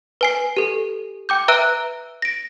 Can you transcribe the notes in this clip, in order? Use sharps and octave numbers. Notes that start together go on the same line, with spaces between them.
B4 G#5 C7
G4 A4
G5 D6 G6
B4 E5 A#5 E6 F#6 D7
A#6 D7